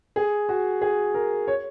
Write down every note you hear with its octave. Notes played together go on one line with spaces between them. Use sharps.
G#4
F#4
G#4
A#4
C#5